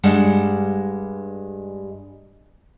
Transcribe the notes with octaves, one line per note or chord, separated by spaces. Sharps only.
G2 G3 G#3 F#5 A5